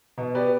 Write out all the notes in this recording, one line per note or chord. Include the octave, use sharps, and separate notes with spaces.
B2
B3 G4 B4 D5